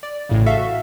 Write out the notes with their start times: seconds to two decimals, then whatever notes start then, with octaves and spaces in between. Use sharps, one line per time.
0.03 D5
0.29 A1 A2 C#3
0.46 F#4 A4 E5 F5